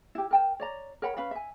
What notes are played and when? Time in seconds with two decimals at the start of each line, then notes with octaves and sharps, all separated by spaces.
0.15 E4 G4
0.31 A#4 G5 A5
0.60 C#5 D5 A#5
1.02 A#4 C#5 F#5 B5
1.17 C#4 B4 F5 B5
1.31 E5 G#5